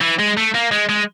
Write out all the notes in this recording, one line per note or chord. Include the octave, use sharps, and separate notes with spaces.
E3
G#3
A3
A#3
G#3
G#3